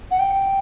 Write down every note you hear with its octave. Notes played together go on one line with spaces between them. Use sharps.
F#5
G5